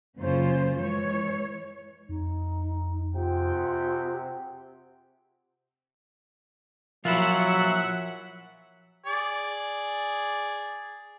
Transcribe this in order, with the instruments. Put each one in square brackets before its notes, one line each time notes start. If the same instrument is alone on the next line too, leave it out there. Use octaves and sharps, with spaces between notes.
[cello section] F#2 C#3 A#3 C#4 F4 C5
E3 G#3 C#5
[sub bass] F2 [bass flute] D#4
[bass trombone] C3 [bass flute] F4 [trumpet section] G#4 F#5 G5
[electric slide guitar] F3 A#4 [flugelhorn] F#3 [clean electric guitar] E4 F4 [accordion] E5 F#5 F#6
[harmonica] G#4 D5